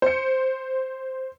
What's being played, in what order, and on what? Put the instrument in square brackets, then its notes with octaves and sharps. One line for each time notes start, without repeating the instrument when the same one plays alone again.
[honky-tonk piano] C5 C#7